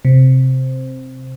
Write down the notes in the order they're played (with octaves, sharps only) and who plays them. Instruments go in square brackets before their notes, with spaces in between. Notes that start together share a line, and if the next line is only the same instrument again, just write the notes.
[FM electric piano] C3